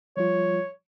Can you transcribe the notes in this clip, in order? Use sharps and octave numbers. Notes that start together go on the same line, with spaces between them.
F3 G3 F4 C#5